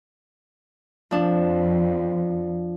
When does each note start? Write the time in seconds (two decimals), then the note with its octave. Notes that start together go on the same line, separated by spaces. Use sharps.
1.11 F2 F3 D4